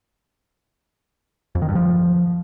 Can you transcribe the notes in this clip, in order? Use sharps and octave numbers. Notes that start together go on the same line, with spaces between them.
F2
D#3
G2
F3